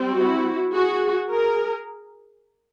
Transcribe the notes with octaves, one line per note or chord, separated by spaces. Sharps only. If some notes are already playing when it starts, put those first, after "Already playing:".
Already playing: G3 C4
E4 F#4
F#4 G#4
G#4 A#4